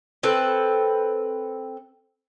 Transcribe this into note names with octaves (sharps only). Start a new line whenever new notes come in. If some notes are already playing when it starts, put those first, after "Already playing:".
C4 A4 B4